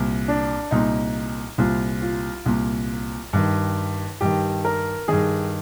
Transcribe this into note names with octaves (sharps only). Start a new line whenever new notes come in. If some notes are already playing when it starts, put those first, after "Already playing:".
Already playing: C2 A#2
D4
C2 A#2 D#4
C2 A#2 F4
F4
C2 A#2
G2 D#3
G2 D#3 G4
A#4
G2 D#3 G#4